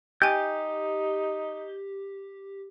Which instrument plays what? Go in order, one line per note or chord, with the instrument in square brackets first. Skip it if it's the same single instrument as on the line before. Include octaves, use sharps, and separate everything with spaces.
[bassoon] D#4 [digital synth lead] G4 [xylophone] G5 G#5 [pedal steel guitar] G6